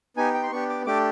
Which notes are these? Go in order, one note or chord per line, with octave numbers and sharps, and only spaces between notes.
B3 D#4 G4 G#5
G5
C6
B3 D4 G4 C#6
D6
A3 D4 G4 D6